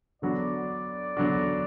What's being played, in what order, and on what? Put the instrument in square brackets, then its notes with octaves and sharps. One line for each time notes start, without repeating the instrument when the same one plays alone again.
[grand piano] D3 F#3 B3 D4 F#4 [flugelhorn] D5
[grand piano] D3 F#3 B3 D4 F#4